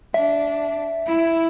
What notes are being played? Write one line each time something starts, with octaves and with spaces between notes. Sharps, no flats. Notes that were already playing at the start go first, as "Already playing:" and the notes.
D4 E5
E4